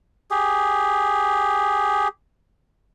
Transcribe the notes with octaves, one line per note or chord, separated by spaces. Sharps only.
G4 G#4